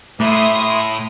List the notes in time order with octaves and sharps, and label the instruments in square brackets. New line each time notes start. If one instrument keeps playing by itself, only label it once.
[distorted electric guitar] A2 [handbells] A3 [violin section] E5 C6 D#6